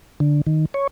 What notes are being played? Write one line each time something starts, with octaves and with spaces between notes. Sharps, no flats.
D3
D#3
C#5